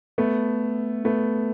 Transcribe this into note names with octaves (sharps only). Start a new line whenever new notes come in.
A3 B3
A3 B3